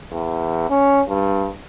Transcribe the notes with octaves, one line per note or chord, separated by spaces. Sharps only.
E2
C#4
G2